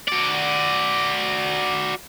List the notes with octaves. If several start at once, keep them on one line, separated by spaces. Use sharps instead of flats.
F#4 D5